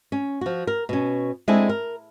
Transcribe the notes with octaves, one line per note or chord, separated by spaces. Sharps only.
C#4
F3 F#4
A#4
B2 C#4
G#3 C4 D4 E4 G#4 A4
A#4